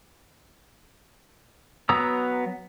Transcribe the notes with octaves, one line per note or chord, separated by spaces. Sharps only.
F#3 B3 A#5 D#6 E6